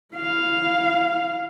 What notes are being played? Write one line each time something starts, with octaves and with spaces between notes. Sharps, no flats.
E4 F5